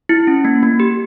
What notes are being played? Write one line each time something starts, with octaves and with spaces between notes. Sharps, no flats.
E4
C#4
A#3
A#3
G4